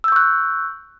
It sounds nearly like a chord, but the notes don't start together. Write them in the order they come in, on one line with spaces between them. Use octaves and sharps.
E6 G6 C#6 F#6